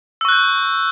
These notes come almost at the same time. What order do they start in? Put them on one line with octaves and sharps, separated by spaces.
E6 C#6 F#6 G6